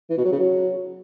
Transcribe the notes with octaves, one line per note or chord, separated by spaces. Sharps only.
E3
B2
F#3
C#3
F#3